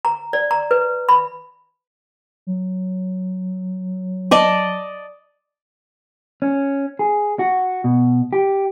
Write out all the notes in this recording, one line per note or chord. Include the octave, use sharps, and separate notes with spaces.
A#5
D5
A#5
B4
B5
F#3
D5 D#5 A5
C#4
G#4
F#4
B2
G4